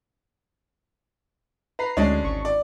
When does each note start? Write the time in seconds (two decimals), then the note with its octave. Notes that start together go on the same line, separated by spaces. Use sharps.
1.79 B4 A#5 C7
1.97 D2 G#3 C#4 D4 D#5 C7
2.24 G#1 C#6
2.45 D5